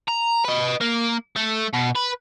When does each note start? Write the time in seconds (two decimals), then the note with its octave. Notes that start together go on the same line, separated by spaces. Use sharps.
0.08 A#5
0.44 B4 D#5
0.81 A#3
1.36 A3
1.73 B2
1.95 B4